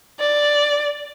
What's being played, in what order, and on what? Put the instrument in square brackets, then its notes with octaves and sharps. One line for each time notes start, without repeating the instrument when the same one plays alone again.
[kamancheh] D5